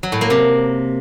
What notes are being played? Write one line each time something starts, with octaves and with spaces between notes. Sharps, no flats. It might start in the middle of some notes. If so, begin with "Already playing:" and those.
F#3
A2
A#3
C3